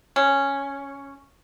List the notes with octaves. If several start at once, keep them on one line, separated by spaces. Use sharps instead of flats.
C#4